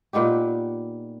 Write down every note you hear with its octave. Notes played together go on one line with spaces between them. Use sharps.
A#2 B3 D#4 G4